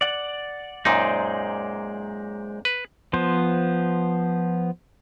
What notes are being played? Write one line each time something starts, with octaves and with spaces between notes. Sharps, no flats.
D5 F#5
F#2 A#2 G#3 D#4 C5 D5
B4
F3 B3 C5